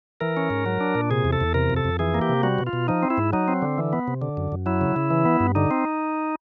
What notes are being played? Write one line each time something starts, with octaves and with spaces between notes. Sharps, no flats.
E3 A#4
C#4
G#2
F#3
D4
A#2
C3 G#4
E2
A4
E2
C3 A#4
F2
A4
F2
E3 G#4
A#3
G4
C3
G3 F#4
B2
F4
B2
F3 D#4
C4
E4
G#2
F#3 D#4
C4
D3
E3
B3
C3
D3
F#2
F#2
F#3 E4
C#3
C#3
E3
B3
G2
D3 D#4
C4